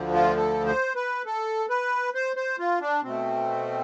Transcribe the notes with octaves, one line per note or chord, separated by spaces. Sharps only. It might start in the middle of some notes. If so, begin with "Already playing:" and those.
Already playing: D2 D3 F3
F4
A4
C5
B4
A4
B4
C5
C5
F4
D4
B2 A3 C4